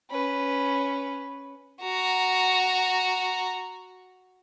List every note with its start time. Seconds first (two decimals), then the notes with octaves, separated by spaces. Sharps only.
0.10 C#4 B4
1.82 F#4 A#5